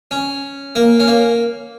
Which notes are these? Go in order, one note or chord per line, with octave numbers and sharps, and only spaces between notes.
C#4
A#3
C#4
A#3